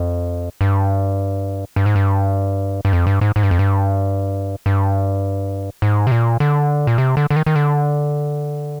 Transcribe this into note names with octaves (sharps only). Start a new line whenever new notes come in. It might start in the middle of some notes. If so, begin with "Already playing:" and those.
Already playing: F2
G2
G2
G#2
G2
G2
F2
G2
G#2
G#2
G2
F2
G2
G2
G#2
C3
A#2
D3
A#2
C3
D3
D3
D#3
D#3
D3